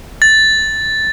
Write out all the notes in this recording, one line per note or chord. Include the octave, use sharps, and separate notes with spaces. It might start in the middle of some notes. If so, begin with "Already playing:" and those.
A6